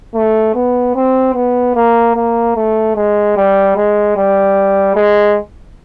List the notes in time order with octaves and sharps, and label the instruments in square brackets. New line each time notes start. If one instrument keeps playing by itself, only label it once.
[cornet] A3
B3
C4
B3
A#3
A#3
A3
G#3
G3
G#3
G3
G#3